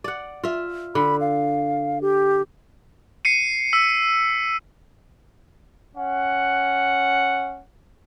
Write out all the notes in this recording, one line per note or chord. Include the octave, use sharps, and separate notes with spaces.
D5 F#5
F4 E5
D3 B5
F5
G4
C7 C#7 D#7
E6 B6
C#4 F#5